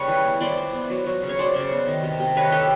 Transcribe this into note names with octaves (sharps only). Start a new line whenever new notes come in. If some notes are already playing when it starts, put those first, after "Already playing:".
Already playing: C#3 G3 B4 C#5
E3
B3
E3 C5 D5
E3
B3
F#3
F#3
C#3
C#5
F#3 C5 D5
C#3
B3
D#3
C3
C3
D#3 B4 C#5
C3 G4 A4